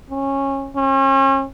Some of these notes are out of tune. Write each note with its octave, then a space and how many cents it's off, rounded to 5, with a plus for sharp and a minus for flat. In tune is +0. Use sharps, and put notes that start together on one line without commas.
C#4 -20
C#4 -40